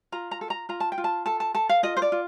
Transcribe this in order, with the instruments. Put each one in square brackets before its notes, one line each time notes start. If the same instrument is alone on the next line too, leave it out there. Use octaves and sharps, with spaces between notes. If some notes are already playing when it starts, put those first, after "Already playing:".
[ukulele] F4 A#5
A#5
A4
A#5
F4 A#5
A5
G5
F4
A5
A4 A5
A5
A4 A5
F5
F4 D#5
C5
D5
F4